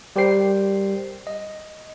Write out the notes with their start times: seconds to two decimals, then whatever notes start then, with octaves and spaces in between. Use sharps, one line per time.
0.16 G3 G4 A#4 C5 G5 C7
1.27 D#5